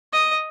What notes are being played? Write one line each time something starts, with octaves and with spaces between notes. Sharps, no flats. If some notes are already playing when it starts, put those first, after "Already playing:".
D#5